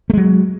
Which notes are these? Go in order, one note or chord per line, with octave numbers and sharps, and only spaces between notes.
F#3 G#3 A3